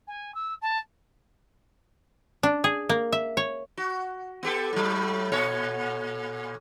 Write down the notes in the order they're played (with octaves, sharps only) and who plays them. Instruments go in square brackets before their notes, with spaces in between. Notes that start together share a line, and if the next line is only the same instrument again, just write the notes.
[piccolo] G#5
E6
A5
[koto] D4
G#4
A#3
E5
C#5
[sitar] F#4
B3 G4 A4
A2 F#3
A#2 A4 C#5